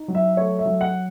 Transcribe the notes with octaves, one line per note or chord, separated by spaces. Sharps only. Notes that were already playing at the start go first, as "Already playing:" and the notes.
Already playing: D#4
F#3
E5
A3 C#5
E5
F#3
F#5